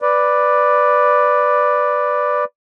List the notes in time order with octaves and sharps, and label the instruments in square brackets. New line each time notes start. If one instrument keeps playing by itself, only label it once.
[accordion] B4 D5